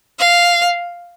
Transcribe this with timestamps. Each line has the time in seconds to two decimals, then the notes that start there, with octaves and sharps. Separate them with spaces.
0.19 F5